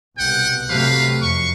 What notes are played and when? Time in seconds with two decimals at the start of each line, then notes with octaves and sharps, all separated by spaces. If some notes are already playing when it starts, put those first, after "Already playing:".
0.18 C2 B2 F#5 G5
0.68 C3 F#3 A3 B4 F5
1.21 F2 C#6